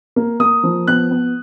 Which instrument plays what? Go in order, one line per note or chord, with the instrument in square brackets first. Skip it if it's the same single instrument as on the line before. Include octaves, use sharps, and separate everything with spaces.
[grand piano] A#3
A#3 D#6
F3
B3 F#6
B3